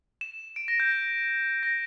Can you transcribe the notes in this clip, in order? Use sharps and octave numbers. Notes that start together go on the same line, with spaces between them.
E7
D7
A#6
G6
A#6
A#6